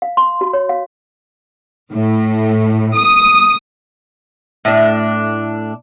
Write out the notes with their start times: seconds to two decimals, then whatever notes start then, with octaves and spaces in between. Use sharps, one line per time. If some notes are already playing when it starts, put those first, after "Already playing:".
0.02 F5
0.17 C6
0.41 F#4
0.53 C#5
0.69 F5
1.90 A2
2.95 D#6
4.65 A2 D4